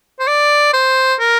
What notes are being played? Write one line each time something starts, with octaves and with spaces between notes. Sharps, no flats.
C5
D5
C5
A#4